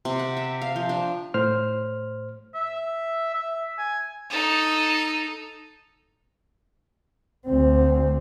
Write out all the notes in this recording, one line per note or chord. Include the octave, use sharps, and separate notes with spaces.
C3
F#5
E5
F5
F3
D4
A2 C5 F6
E5
E5
G#5
D#4 A4
D2 C4